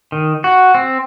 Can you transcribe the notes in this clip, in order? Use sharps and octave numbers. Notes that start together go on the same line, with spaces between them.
D#3
F#4
C4